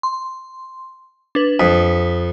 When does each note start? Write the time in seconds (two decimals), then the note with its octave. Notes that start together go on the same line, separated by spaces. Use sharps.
0.03 C6
1.35 D4 B4
1.60 F2 D#6 B6